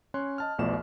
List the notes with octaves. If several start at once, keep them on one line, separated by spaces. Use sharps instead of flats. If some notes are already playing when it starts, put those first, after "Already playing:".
C#4 C#5 C6 F#6
D#5 A5 F6
B1 E2 F3 A3 D5 E7